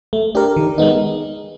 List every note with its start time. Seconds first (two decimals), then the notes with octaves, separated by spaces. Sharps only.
0.13 A3
0.35 D4 G4 A#4
0.56 D#3
0.78 G#3 B3 D#4